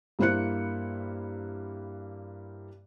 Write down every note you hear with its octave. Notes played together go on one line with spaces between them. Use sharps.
G2 A#3 E4 C5 F#6 C#7